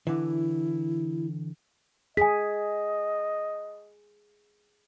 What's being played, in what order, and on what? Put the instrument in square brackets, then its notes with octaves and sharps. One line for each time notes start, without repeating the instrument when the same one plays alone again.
[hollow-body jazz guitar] D3 E3 [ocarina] E4
[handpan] G#4 [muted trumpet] D#5 [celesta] G#5 B6